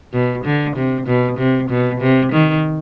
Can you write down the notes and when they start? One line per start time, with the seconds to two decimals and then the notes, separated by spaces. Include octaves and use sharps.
0.13 B2
0.45 D3
0.76 C3
1.07 B2
1.38 C3
1.70 B2
2.01 C3
2.32 D#3